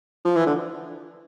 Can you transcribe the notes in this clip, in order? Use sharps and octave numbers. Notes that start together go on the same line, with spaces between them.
F3
E3
D3